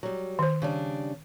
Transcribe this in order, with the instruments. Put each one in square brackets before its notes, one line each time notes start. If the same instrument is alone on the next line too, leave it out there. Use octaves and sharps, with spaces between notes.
[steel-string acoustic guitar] F#3 G3
[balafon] D#3 C5
[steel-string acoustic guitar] C#3 G3 D4